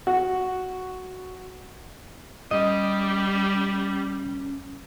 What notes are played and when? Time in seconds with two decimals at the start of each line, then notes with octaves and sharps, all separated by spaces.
0.07 F#4
2.51 G3 C#4 D#5